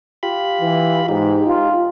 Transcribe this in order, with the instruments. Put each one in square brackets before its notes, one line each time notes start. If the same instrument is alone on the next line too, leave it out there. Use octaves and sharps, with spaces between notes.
[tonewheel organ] F4 G4 B5
[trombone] E3
[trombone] G#2 [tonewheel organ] D#4 G4
[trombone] F4